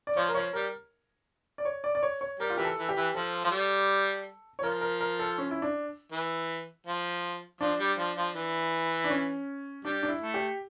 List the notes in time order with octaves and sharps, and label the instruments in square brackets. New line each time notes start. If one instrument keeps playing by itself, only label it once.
[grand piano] D5
[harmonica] F3 [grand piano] C#5
[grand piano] A#4
[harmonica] F3 [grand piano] C#5
[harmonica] G3 [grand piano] A#4
[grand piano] D5
C#5
D5
D5
C#5
C#5
[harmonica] G3 [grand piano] A#4
[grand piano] F4
[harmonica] E3 [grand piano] G4
[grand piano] A4
[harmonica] E3
[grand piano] G4
[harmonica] E3
[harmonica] F3 [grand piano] A4
[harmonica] F3
G3
[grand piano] C#5
[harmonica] F3 [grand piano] A#4
[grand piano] A#4
A#4
A4
C#4
E4
D4
[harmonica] E3
F3
[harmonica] F3 [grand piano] D4
[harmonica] G3
F3
F3
E3
[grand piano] D4
C#4
[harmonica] G3 [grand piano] D4
[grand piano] D4
E4
[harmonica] A3
[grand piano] G4